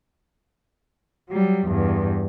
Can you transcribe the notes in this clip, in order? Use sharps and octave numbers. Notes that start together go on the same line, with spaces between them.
F#3 G3
E2 G2